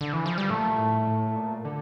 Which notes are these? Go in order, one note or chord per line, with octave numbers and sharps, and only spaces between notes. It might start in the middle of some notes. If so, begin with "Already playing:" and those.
D3
E3
F3
G3
A#2 A3
A2
A2
A2
A#2
D3